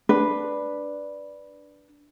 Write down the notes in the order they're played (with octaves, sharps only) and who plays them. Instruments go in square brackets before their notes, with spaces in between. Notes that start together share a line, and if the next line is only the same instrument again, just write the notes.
[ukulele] D4 B4